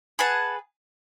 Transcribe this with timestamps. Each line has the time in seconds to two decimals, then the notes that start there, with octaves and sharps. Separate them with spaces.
0.19 G#4 B4 F#5 A5